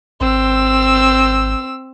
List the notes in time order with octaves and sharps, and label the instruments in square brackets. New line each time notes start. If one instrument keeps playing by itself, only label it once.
[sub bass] G#1 [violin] C4 E6